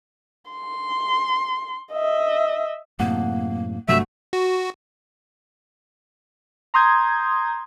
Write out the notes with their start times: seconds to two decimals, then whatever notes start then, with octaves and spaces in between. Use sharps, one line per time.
0.51 C6
1.93 D#5 E5
2.99 F#2 A2 C3 A#3 F#5 D#6 G6
3.88 G1 C3 F#3 G3 A3 F#4 E5 C#6
4.33 F#4
6.74 A#5 C6 D#6 G6 G#6